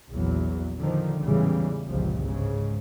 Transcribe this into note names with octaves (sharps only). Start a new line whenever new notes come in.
A#1 E2 F#3
D3 D#3 F3
A1 E2 G#2 C#3 E3 G3
G1 C#2 A#2 F3
G#2 C#3